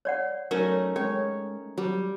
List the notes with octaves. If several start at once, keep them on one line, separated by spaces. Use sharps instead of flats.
C#5 D5 F#5
F#3 A3 C#4 D#4 A#4
G#3 C#4 C#5
F#3 G3